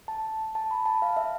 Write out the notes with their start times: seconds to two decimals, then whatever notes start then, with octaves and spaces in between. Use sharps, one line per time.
0.08 A5
0.55 A5
0.71 B5
0.86 A5
1.02 F5
1.17 E5